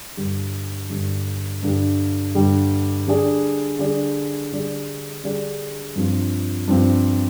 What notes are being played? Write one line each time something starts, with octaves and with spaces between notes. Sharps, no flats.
G2 D3 G3
G2 D3 G3
G2 D3 G3
G2 D3 G3
D3 G3 D4 G#4 D5
D3 G3 D4 G#4 D5
D3 G3 D4 G#4 D5
D3 G3 D4 G#4 D5
G2 F3 C4 F4
G2 F3 C4 F4